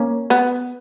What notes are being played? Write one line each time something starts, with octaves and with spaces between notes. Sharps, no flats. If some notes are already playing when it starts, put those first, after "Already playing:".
Already playing: A#3 C#4
B3